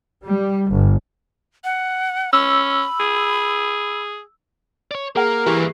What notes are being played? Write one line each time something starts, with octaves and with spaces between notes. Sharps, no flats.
G3
G1
F#5
C#4 B5 E6
G#4
C#5 D5
A#3 G#4 A#4 F#5
G2 E3 A#3 G4